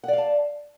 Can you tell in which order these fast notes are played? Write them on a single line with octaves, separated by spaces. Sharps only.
F#5 D5 F5 A5